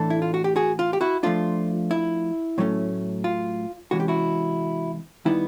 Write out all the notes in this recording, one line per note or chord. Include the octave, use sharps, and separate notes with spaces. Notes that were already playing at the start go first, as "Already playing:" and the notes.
Already playing: A2 E3 A3 D4 A4
E4
F4
F#4
G4
F#4 G#4
F4
G4
E4 F#4
F3 A3 D4 F4
E4
A2 F#3 A3 C#4
F4
C3 E3 G#3 C#4 F#4
G4
E4 F#4
D#3 G3 B3 D#4 E4